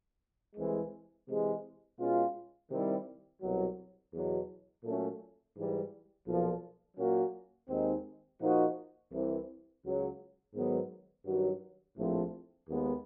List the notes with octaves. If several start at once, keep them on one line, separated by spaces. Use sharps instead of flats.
C2 C3 E3 G#3
C3 E3 G#3
B2 G#3 C#4 F4
C3 D#3 G3 C4 E4
C2 B2 F#3
E2 B2 F#3
A#2 F#3 A3 C#4
G#2 E3 G3
B1 A#2 F3
A#2 F#3 A#3 C#4 F#4
D#2 D#3 G#3 C4 D#4
A#2 F3 A#3 D#4 F#4
C2 C3 E3
C#2 C#3 F#3
G#2 D#3 F#3 B3
G2 D#3 F#3
A#1 A2 F3 A3 C4
D#2 D#3 G#3 B3